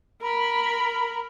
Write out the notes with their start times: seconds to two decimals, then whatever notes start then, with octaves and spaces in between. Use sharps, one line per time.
0.23 A#4 B5